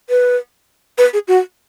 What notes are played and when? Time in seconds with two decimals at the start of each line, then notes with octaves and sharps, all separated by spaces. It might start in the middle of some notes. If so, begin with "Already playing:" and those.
0.10 B4
0.98 B4
1.13 G#4
1.28 F#4